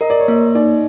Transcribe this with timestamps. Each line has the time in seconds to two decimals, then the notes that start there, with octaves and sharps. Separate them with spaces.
0.01 A#4 D#5
0.10 D5
0.19 C#5
0.28 A#3 D5
0.55 D#4 D5